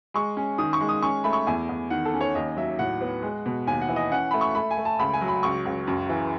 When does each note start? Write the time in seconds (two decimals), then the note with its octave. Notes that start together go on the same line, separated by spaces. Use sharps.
0.14 G#3 C#6
0.37 C#4
0.58 D#3 D#6
0.73 C#6
0.80 G#3
0.89 D#6
1.02 C#4 C#6
1.24 A3 B5
1.33 C#6
1.47 E2 G#5
1.69 E2
1.90 D#3 F#5
2.05 A4
2.14 C#4
2.21 C#5
2.35 D#2 D#5
2.57 F#3 E5
2.79 A2 F#5
3.01 B3
3.23 G#3
3.46 B2
3.67 D#2 G#5
3.82 F#5
3.89 E3
3.96 D#5
4.12 C#4 F#5
4.31 A3 B5
4.41 C#6
4.55 A3 B5
4.71 G#5
4.78 A3
4.85 A5
4.99 C#2 B5
5.13 G#5
5.21 F#3
5.28 B5
5.43 C#2 C#6
5.66 C#2
5.87 F#2
6.09 E3